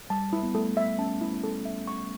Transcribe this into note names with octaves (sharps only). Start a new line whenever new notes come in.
G3 A5
E4
B3
A3 A4
E5
C#4 A5
E4
A4
E5
C#6